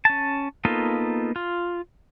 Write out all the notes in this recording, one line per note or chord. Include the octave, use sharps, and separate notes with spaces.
C#4 A5
A#3 B3 D#4 F4 A4
F4